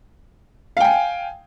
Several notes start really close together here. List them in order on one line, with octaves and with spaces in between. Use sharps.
F5 G5 G#5